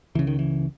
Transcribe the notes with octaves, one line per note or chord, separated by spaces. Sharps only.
C#2 C#3 E3
D#3
E3